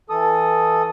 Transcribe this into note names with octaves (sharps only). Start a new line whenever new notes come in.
E3 A4 D#6